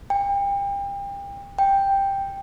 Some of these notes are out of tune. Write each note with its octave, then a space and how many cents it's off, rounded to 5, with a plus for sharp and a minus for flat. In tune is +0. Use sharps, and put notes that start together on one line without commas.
G5 +30
G5 +5